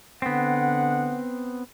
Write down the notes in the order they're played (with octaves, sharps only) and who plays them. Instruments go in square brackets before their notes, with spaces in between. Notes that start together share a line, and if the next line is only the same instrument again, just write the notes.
[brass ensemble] D3 F#5 [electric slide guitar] B3 C4